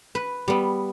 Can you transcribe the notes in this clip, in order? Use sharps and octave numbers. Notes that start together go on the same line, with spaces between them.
B4
G3 B3